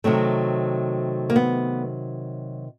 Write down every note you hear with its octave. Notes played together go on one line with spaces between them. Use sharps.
C3 D#3 F#3 A3 C4
A#3
B3